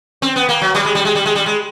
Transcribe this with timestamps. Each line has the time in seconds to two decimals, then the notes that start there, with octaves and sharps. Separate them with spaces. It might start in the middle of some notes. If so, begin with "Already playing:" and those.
0.22 C4
0.36 B3
0.49 A#3
0.62 F#3
0.75 G3
0.85 G#3
0.95 G3
1.05 G#3
1.15 G3
1.26 G#3
1.35 G3
1.46 G#3